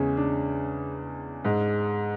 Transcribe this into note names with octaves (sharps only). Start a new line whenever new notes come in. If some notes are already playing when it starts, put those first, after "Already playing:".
Already playing: E2 C#3 G#3 C#4
D4
G#2 G#3